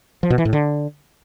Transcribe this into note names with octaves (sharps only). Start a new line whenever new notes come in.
F3
B2
E3
A2
D3